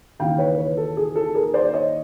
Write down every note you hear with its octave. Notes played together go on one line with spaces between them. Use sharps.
D#2 C#3 E3 F5 G5
B4 C#5
B4 C#5
A4
G#4
A4
G#4 A#4
C5 D5
D5
C#5 D#5